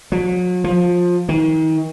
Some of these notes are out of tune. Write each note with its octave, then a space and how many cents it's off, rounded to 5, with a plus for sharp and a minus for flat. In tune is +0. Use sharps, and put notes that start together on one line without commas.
F#3 -40
F3 +20
D#3 +40